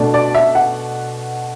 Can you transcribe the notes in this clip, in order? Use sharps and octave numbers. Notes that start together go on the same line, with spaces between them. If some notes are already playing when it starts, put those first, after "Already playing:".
Already playing: B2 A3 D4
D5
E5
F#5